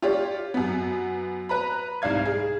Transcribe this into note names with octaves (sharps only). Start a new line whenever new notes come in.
F4 G4 C#5 D5
F#2 B3
B4 A#5 B5
C2 G#2 D5 F5 G#6
G#4